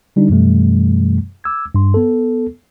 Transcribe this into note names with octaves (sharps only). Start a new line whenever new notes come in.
D3 G3 D4 D#4
F#2 B2 E3 G3 A3
D6 E6 G#6
G2 C6
B3 A4